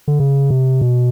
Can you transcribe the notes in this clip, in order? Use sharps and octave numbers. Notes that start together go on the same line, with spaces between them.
D3
C#3
C3
B2